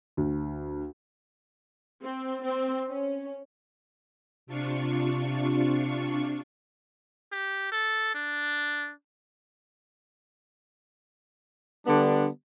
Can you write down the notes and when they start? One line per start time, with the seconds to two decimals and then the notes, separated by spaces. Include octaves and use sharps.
0.17 D2
2.02 C4
2.42 C4
2.90 C#4
4.47 C3 D4 F4 C#6
7.32 G4
7.72 A4
8.15 D4
11.86 D3 G3 B3 D4